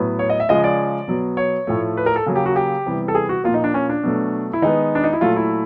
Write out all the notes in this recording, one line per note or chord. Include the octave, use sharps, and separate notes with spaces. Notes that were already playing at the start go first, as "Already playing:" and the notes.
Already playing: A2 F#3 B3
C#5
D#5
E5
C#3 F3 G#3 D#5
D5
B2 F#3 B3
C#5
A2 F3 A3
B4
A#4
A4
C#3 F#3 A#3
G4
F#4
G4
C3 E3 G3 B3
A4
G#4
F#4
A#2 F3 A#3 F4
D#4
D4
C#4
D4
B2 F#3 A3
E4
D#3 G#3 B3 D#4
D4
D#4
E4
A#2 F#3 A3 F4
E4